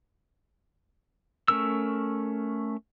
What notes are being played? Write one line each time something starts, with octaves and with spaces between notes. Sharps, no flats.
A3 C#4 A#4 E6